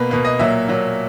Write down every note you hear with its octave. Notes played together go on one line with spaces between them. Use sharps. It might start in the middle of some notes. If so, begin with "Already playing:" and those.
Already playing: B2 A#3 B4
B2 A#3 B4
D#5
A#2 F#3 A#3 E5
A#2 F#3 A#3